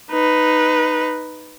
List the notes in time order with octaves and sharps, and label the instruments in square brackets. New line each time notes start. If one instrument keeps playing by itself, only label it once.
[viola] D#4 B4